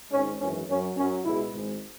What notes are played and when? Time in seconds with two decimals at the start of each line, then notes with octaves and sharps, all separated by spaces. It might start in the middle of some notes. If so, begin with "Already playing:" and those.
0.12 G#1 G#2 G#3 C#4
0.40 G#1 F#2 E3 G#3 C#4
0.68 F#2 F#3 C#4
0.96 F#2 F#3 C#4
1.25 C#2 B2 G#3 E4
1.53 G#1 G#2 G#3